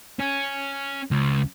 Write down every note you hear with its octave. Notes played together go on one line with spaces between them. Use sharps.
C#4
C#2